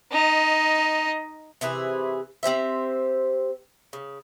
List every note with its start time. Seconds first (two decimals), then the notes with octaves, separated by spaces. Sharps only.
0.11 D#4 D#5
1.61 C3 E3 G#4 B4
2.43 C4 G4 C5 E5
3.93 C#3